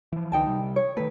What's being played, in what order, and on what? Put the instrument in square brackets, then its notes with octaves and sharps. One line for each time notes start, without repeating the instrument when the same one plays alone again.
[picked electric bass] E3 F3
[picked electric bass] C2 D3 E3 [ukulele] D#4 G5 A5
[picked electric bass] C3 G3
[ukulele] C#5
[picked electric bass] D#3 A3 [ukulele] B4